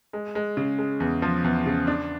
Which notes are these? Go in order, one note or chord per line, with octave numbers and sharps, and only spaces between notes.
G#3
G#3
C#3
G#3
E2
F3
E2
C#3
D4